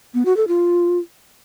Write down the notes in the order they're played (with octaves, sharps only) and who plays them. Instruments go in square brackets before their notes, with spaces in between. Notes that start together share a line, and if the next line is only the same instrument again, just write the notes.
[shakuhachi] B3
F#4
A4
F4